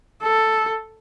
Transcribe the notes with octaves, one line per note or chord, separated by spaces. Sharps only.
A4